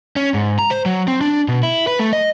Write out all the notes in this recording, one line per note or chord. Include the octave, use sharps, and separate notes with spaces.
C#4
G#2
A#5
C5
F#3
C4
D4
B2
E4
B4
A3
D#5